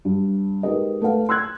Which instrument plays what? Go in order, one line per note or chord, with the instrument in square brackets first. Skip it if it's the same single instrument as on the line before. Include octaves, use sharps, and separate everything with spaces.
[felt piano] G2
G#3 D#4 G4 A#4 B4 D#5
A3 B4 F5
C6 E6 F#6 G#6